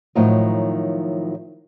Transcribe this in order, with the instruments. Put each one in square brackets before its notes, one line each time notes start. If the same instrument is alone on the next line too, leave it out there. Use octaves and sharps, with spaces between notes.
[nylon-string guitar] A2 D#3 F3 F#3 D#4